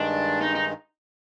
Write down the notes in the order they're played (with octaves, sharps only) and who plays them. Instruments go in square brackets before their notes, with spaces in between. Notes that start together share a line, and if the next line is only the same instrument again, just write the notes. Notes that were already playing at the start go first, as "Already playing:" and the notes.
Already playing: [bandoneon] G2 D#3 G#3 [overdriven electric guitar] D4
[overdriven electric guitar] D#4
D#4